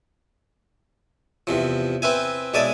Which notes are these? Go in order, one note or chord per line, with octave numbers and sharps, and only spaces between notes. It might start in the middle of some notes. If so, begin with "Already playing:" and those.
E2 C3 F3
C4 B4 E5 G#5
B1 G#3 D5 E5 G#5 A5